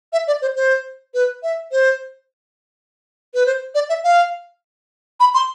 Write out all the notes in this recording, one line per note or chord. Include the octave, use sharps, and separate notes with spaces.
E5
D5
C5
C5
B4
E5
C5
B4
C5
D5
E5
F5
B5
C6